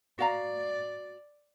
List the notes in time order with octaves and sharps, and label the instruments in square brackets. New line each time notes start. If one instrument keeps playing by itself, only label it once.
[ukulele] F#4 F5 A#5 [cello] D5